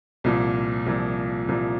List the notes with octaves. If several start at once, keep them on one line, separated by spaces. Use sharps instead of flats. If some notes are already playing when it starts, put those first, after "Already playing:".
C2 A#2 F3
C2 A#2 F3
C2 A#2 F3